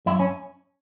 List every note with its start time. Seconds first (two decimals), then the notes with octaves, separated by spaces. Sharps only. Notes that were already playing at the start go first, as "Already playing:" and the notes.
0.06 F#2 E4
0.19 C#4